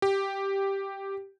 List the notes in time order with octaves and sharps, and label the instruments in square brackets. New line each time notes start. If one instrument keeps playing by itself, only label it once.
[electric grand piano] G4